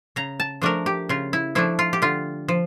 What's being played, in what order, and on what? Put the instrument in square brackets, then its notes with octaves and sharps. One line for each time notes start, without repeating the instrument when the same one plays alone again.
[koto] C#3 A#5
A5
F3 A3 D4 A#4
G4
C#3 F4
E4
F3 A3 D4 E4
F4
G4
D3 F4
F3